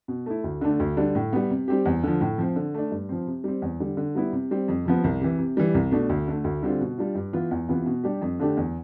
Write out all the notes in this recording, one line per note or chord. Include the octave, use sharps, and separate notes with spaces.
B2
A3 E4
D2
D3 A3 D4
D2
D3 G3 D4
A2
G3 B3
C3
G3 C4 G4
E2
D3 F3
A2
F3 C4
D3
A3 D4
G2
F3 C4
C3
G3 C4
E2
D3 G3
D3
G3 B3 E4
C3
G3 C4
F2
C3 F3 B3
C2
C3 E3
C3
E3 G3
C2
B2 A3 D4
D2
D3 A3
D2
D3 G3 C4 F4
B2
G3 D4 F4
G2
E3 B3 F4
E2
C3 E3 B3 F4
B2
G3 D4 G4
F2
D3 A3 D4 G4
E2